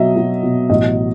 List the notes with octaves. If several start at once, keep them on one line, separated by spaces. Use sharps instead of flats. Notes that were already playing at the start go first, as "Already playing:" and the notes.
Already playing: B2 F#3 D#5 E5
F#3
B2
A1 D#5